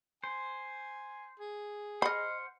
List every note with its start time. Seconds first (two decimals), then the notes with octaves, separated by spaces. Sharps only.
0.24 C5 G#5
1.40 G#4
2.02 C5 D#5 F#5 B5 F6